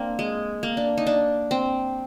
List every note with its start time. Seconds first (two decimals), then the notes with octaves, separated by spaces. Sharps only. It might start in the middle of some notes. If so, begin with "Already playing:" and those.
Already playing: A#3 C4 D4
0.19 G#3
0.63 A#3
0.77 D4
0.97 D#4
1.07 D4
1.51 C4